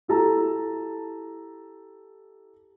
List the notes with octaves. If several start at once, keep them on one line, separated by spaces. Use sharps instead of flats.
E4 G4 A4 A5 A#5